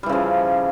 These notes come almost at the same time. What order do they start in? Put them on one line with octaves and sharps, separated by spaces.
G3 E3 C#3 F3